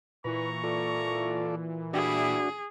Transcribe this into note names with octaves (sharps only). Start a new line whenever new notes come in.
A#2 E3 B4 A#5 C#6
F4 A4 D5
G3 D4 E4 F#4 G#4